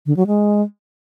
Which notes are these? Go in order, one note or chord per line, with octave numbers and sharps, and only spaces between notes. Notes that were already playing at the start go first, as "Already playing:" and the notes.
D3
F#3
G#3